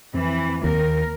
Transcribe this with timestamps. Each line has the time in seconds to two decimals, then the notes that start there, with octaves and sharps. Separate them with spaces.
0.14 F2 E3 C4
0.64 D#2 A#4